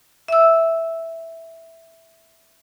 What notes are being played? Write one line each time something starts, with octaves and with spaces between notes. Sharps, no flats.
E5 E6